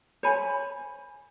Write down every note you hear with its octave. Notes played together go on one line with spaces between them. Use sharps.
C5 C#5 G#5 B5